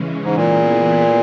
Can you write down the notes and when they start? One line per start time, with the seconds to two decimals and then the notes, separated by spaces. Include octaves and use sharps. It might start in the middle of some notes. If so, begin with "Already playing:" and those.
Already playing: C#3 E3 G#3 C#4
0.24 G#2
0.36 A#2 E3 B3 E4 G#4